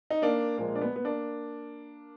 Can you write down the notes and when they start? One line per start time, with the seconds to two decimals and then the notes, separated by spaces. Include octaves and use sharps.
0.10 D#4
0.22 A#3 D4
0.57 A#2 F3 G#3 A#3
0.75 D4
0.81 B3
0.96 B3
1.05 A#3 D4